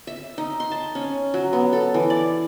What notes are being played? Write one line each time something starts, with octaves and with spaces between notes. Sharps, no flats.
E5
D#4
C6
A5
C#4
F#3
B3
A4
E3
D5